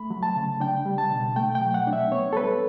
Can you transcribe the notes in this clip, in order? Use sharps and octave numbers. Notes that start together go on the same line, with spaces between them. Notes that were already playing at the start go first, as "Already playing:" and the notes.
Already playing: A3 B5
F#3
A5
C#3
D4 G5
G3
A5
B2
A3 G5
G5
F#3
F#5
D4
E5
B3 C#5
A4
G3 B4